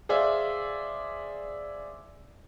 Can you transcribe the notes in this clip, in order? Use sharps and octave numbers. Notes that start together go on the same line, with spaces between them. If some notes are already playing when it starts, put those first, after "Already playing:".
G#4 C5 D5 E5 F5